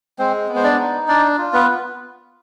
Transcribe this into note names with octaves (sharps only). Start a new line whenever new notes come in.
G#3 C4 C5
B3
C5
D4 D5
D#4
D4 D5
F4
B3 B4